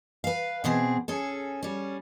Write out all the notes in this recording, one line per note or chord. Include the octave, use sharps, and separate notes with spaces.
B4 F5
B2 E3 C4 G#4
C#4 G#4 A4
G3 C#4